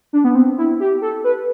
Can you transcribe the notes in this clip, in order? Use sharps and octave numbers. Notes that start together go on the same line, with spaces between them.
D4
B3
C4
E4
G4
A4
B4